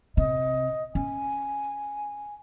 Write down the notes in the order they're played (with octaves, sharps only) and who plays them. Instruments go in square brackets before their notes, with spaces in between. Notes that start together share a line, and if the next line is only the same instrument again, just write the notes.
[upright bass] C3 [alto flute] D#5
[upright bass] C#4 [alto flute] G#5